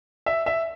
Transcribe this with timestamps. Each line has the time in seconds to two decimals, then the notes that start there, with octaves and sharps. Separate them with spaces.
0.26 E5
0.46 E5